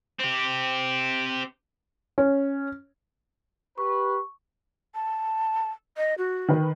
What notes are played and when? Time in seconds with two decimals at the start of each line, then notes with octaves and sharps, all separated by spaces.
0.19 C4 G4
2.18 C#4
3.78 G4 B4 C#6
4.95 A5
5.97 D#5
6.18 F#4
6.48 D#3 B4